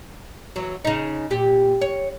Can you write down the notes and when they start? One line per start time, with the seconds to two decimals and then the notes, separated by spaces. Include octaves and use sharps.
0.56 E3 F#3
0.85 C#3 D#4
1.30 A#2 G4
1.81 C#5